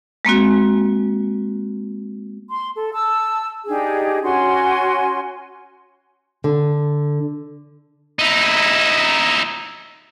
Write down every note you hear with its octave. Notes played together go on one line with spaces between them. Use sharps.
G#3 A#3 C4 F#4
C6
A4
A5 E6
D4 D#4 G4 G#4
C#4 F#4 G#5 C6
D3
D#4 E4